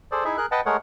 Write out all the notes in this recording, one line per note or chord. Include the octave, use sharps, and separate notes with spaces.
G#4 A4 C5 D5
D#4 E4 G#4 E5
G#4 A#4 F#6
B4 D#5 F#5 G5 A5
G#3 A3 G#4 A#4 C#5 F#5